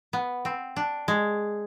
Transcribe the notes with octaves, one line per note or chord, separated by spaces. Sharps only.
B3
C4
D4
G#3